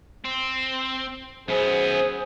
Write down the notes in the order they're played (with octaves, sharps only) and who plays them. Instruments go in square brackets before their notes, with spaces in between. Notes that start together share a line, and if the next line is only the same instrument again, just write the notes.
[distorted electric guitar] C4
[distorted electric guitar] F#2 B3 [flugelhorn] G#4 [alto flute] C5